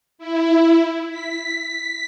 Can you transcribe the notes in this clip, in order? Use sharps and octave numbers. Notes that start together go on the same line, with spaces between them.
E4
B6